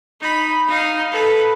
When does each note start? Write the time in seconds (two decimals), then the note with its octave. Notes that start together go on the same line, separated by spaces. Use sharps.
0.21 D#4 B5
0.68 D#4 F5
1.11 A4 B4